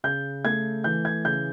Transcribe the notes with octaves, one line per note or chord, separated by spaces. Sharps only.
C#3 G6
A3 G#6
E3 G6
G#6
C#3 G6